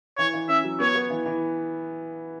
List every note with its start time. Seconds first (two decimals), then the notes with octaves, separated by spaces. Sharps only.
0.18 E3 C#5
0.34 E3
0.48 C#4 E5
0.64 F#3
0.80 B3 C#5
0.95 B3
1.10 E3
1.26 E3